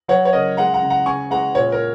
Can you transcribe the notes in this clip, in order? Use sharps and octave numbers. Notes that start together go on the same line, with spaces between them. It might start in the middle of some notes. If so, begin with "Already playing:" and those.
F#3 C#5 F#5
C#5
C#3 A#4 D#5
G#3 F#5 A#5
F#5 A#5
C#3
F#5 A#5
C#3 G#5 C#6
G#3 F#5 A#5
A#2 C#5
A#4